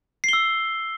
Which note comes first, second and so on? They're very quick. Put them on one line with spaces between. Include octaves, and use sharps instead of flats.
C7 G7 E6